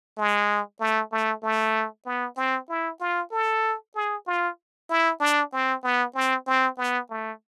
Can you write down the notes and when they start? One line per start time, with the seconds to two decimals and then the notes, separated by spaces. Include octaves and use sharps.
0.17 G#3
0.80 A3
1.12 A3
1.43 A3
2.06 B3
2.37 C4
2.69 E4
3.00 F4
3.32 A4
3.95 G#4
4.27 F4
4.90 E4
5.20 D4
5.53 C4
5.83 B3
6.15 C4
6.47 C4
6.78 B3
7.10 A3